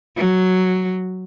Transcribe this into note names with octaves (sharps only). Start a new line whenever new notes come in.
F#3